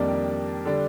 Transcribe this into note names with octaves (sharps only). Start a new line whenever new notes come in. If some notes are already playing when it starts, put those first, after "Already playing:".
Already playing: F2 D#3 G3 A#3 D4
D3 G3 D4